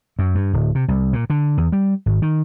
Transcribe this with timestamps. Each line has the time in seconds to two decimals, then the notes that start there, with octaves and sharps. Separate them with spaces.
0.19 F#2
0.35 G2
0.53 D1
0.75 C3
0.88 C2
1.13 A#2
1.30 D3
1.58 E2
1.72 G3
2.06 G#1
2.22 D#3